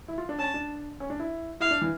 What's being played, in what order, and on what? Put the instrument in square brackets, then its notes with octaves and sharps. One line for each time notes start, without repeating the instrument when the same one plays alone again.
[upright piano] E4
F4
D4
[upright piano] C#4 [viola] A5
[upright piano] D4
C#4
D4
E4
[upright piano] E4 [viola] F5
[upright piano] D4
E3